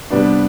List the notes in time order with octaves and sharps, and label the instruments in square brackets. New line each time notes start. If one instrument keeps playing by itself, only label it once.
[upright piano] C3 G3 B3 D4